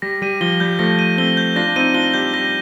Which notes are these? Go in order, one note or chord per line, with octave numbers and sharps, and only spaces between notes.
G3 A#6
G3 D#7
F3 G7
G3 G6
F3 A3 A#6
D#7
A3 C4 G7
G6
D4 F4 A#6
D4
C4 D#4 D#7
D4 F4 G7
G3 G6
G3 A#6